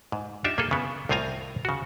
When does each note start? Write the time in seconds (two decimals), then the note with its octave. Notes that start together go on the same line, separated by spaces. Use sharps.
0.12 G#2
0.45 D4 D#4 F4 G4 E5
0.58 A#3 F4 G#4 A4
0.71 C#3 B3
1.09 C2 A2 C4 F4 G#5 A#5
1.65 C#3 F#4